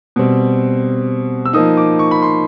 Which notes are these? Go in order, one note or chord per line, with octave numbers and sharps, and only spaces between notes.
B2 G3 C4
E6
F3 A#3 D#4 D#6
D6
C#6
B5
C6